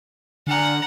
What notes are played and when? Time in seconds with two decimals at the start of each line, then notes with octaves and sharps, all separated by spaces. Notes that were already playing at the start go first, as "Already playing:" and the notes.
0.47 D3 D5 F#5 G#5 A#5 F6